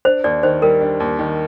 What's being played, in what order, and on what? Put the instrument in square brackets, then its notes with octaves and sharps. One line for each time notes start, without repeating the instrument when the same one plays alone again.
[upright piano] D4 [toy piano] C5
[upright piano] D#2 [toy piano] D5
[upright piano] D#3 [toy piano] C5
[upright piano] G3 [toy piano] A#4
[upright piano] D4
D#2
D#3